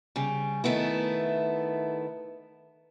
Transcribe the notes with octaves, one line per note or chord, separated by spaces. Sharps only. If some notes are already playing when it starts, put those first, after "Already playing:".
C#3 G3
D#3 A3 B3 E4